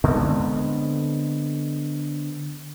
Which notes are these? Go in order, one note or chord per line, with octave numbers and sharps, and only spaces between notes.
D3 G#3 B3 C4